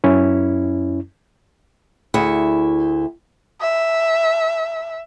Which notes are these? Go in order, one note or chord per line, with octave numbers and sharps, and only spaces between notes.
F#2 C#4 E4
D2 E4 G#4 F#5
E5